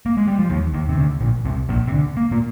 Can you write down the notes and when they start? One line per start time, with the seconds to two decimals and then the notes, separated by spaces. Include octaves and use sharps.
0.06 A#3
0.17 G#3
0.28 G3
0.39 F3
0.50 D#2 D#3
0.74 D#2 D#3
0.89 C3
0.97 D2 D3
1.21 A#1 A#2
1.45 C2 C3
1.69 A#1 A#2
1.87 C3
1.92 D2 D3
2.17 A#3
2.31 A#2 A#3